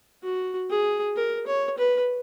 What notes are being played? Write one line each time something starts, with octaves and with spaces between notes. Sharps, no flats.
F#4
G#4
A#4
C#5
B4